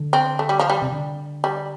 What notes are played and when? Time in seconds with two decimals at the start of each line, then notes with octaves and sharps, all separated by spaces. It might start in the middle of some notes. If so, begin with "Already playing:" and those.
Already playing: D3
0.13 C4
0.39 A3
0.49 G3
0.59 F3
0.69 G3
0.82 C3
0.92 D3
1.44 G3